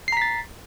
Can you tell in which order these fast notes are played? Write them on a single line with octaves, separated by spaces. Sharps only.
C7 A#5 B6 A6